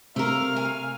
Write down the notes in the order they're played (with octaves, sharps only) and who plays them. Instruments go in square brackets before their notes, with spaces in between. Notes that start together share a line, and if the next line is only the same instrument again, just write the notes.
[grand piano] C3 [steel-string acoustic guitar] A3 A#4 [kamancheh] F5 F6
[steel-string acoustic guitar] G#5